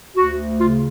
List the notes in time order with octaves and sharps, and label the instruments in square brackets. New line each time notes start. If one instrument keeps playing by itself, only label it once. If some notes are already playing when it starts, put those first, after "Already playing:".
[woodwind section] D2 F#4
C#3 F4